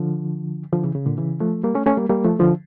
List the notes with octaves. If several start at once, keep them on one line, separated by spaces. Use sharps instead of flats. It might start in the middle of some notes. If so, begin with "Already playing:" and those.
Already playing: D3 F3
D3 F3
C#3 E3
C#3
A#2 D3
C#3 E3
F3 A3
G3 A#3
A3 C#4
A3 C#4
G3 A#3
G3 A#3
F3 A3
D3 F3